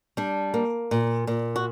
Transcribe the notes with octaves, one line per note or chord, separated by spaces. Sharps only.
G3 D4
A#3
A#2
A#2
F#4